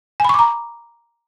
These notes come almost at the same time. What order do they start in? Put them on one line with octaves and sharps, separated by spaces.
G#5 B5 C#6 D6 A#5